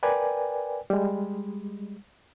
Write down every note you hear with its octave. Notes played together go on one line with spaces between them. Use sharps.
A#4 B4 D5 G5 G#5
G3 G#3